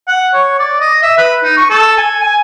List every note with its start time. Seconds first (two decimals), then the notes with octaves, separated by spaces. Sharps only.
0.08 F#5
0.34 C#5
0.59 D5
0.80 D#5
1.03 E5
1.18 B4
1.43 D#4
1.57 C#6
1.70 A4
1.97 G#5
2.23 G#5